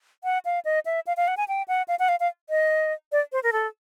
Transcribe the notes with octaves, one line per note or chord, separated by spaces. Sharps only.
F#5
F5
D#5
E5
F5
F5
F#5
G#5
G5
F#5
F5
F#5
F5
F5
D#5
D5
C5
A#4
A4